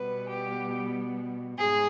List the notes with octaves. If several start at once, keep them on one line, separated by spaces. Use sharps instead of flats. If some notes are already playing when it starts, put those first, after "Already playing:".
Already playing: B2 G3 B3 B4
G4
G#2 G#4